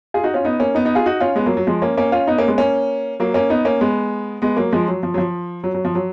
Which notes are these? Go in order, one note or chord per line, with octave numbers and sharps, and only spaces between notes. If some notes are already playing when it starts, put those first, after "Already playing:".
F4 G#4
D#4 F#4
C#4 F4
B3 D#4
A#3 C#4
B3 D#4
B3 D#4
F4 G#4
D#4 F#4
C#4 F4
G#3 B3
F#3 A#3
F#3
F3 G#3
A#3 C#4
A#3 C#4
C#4 F4
B3 D#4
A#3 C#4
G#3 B3
A#3 C#4
F#3 A#3
A#3 C#4
B3 D#4
A#3 C#4
G#3 B3
G#3 B3
F#3 A#3
F3 G#3
F#3
F3
F#3
F3
F#3
F#3
F3
F#3